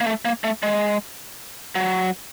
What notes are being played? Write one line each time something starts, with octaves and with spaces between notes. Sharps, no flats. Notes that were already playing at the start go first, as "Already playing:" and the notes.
A#3
A3
A#3
A3
G#3
F#3